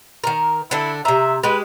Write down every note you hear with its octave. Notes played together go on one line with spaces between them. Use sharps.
D#3 A#4
D3 D4 E4 A4
C3 E5 A#5
G#3 G4 B4